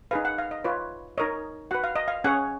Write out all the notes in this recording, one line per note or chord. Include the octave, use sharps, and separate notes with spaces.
D#4 G#4 B4 F5
F#5
F5
D#5
F4 B4 C#5
D#4 A#4 C#5 D#5
F#4 B4 F#5
F5
D#5
F5
C#4 G#4 C#5 F#5